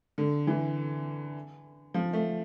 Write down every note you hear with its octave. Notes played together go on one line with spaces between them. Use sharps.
D3
E3
F3
A3